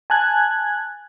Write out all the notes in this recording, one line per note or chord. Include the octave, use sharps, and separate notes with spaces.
G#5 A5 F#6 G#6